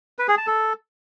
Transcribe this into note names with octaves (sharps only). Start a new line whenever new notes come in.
B4
G#4
A5
A4